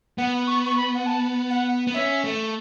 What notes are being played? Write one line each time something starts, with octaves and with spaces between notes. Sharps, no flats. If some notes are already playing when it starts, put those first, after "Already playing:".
B3 F#5
C#6
C#6
B5
F#5
A5
F#5
B3
C#4 E5
A3